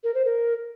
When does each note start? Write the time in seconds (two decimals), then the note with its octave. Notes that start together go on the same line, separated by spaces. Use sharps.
0.04 A#4
0.14 C5
0.25 A#4